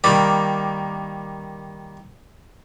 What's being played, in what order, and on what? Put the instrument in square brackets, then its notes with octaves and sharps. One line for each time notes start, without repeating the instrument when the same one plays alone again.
[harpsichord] D#3 G3 A#3 B5 D6